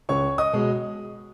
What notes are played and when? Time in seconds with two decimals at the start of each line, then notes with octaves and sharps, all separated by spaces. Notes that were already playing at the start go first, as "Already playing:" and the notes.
0.09 C#2 C#5 C#6
0.38 D#5 D#6
0.53 B2 G#3